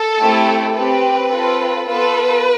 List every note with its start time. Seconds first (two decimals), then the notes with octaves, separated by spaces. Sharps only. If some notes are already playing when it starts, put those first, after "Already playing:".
Already playing: A4
0.20 A3 C4 E4 G4
0.75 C4 G4 B4
1.31 C4 F4 A4
1.87 B3 F4 A4 B4